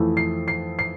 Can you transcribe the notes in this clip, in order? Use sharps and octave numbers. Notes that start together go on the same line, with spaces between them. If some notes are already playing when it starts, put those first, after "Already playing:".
Already playing: F2 E3 A3 E4
C7
C7
C7